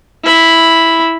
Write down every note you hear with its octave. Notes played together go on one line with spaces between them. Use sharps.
E4 B5